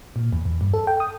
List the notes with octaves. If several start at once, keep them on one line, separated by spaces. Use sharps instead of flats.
A#2
E2
E2
G2
A4
G5
D#6